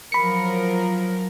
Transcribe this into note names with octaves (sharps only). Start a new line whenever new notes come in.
F3 F#3 A#4 B5 C#7